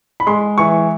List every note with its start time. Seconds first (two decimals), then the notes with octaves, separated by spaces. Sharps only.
0.20 B5
0.27 G#3 C6
0.58 E3 C#6